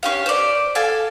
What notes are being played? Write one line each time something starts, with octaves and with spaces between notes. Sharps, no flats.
C#4 G4 F5
C5 D5
A4 F5 G#5